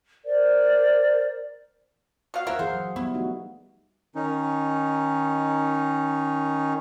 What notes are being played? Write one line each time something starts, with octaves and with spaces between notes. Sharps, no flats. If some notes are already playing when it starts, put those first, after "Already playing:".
A#4 C5 D5
B2 F5
A#3 E4 A#4 C5 E5 F#5
E3 G#4 C5 F5
F#3
G3 B3 E4
A3 D#4 F#4
D#3 C#4 D#4